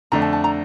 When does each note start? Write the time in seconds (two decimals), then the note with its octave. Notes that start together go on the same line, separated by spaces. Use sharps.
0.12 F2 D3 A3 D4 A#5
0.22 A5
0.33 A5
0.44 A#5